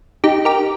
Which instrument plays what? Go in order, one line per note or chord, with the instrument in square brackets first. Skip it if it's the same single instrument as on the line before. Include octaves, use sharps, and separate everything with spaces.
[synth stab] D#4 G4
G4 A#4